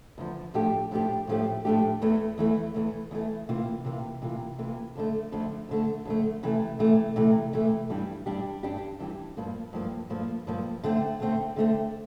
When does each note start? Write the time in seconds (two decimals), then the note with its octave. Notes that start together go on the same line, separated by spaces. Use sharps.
0.18 E2 D3 F3
0.54 A2 F3 A3 D4 G4
0.91 A2 F3 A3 D4 G4
1.27 A2 F3 A3 D4 G4
1.65 A2 F3 A3 D4 G4
2.02 E2 E3 A3
2.38 E2 E3 A3
2.74 E2 E3 A3
3.11 E2 E3 A3
3.49 C3 E3 A#3 F4
3.85 C3 E3 A#3 F4
4.22 C3 E3 A#3 F4
4.58 C3 E3 A#3 F4
4.95 F2 D3 A3
5.32 F2 D3 A3
5.69 F2 D3 A3
6.05 F2 D3 A3
6.43 C3 E3 A3
6.79 C3 E3 A3
7.16 C3 E3 A3
7.53 C3 E3 A3
7.90 G2 E3 G3 D4 G4
8.26 G2 E3 G3 D4 G4
8.63 G2 E3 G3 D4 G4
8.99 G2 E3 G3 D4 G4
9.37 G2 F3 A#3
9.73 G2 F3 A#3
10.10 G2 F3 A#3
10.47 G2 F3 A#3
10.83 D3 A3 C4
11.20 D3 A3 C4
11.56 D3 A3 C4